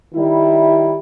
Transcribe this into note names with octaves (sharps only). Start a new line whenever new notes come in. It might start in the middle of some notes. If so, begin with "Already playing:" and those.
D#3 G3 E4